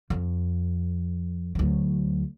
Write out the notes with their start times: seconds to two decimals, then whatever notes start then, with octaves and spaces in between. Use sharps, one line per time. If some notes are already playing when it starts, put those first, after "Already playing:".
0.10 F2
1.55 D2 F#3